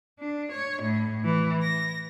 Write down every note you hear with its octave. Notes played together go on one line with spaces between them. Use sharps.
D4
C#5
A2
E3
A#6